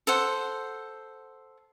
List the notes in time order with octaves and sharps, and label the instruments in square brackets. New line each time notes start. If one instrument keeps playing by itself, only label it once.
[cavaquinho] A4 C5 F#5